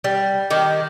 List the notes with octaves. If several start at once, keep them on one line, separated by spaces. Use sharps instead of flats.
G3
D#3 G4